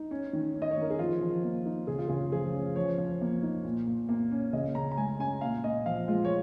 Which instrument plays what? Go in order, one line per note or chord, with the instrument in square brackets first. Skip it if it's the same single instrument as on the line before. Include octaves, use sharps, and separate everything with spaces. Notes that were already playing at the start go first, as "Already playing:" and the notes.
Already playing: [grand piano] D#4
C#4
D#3
C#4
D#5
C#5
D#3 A#4
G#4
F3 F4
F3
A#3
D#4
C#3 G#4
F4
C#3 G#4
F3 G#4
C#4
F3 C#5
F3
A#3
D#4
A#2
A#2
A#3
C#4
C#3 D#5
C#3 A#5
A#5
G#3 G#5
C#4 G#5
A#2 F5
A#2 D#5
F3 F5
G#3 F4
C#5